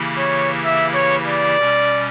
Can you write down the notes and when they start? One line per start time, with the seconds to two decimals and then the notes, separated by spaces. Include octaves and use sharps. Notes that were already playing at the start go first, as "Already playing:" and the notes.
Already playing: C#3 E3 A#3 E4 G4
0.18 C#5
0.65 E5
0.95 C#5
1.26 D5
1.58 B2 G3 C#4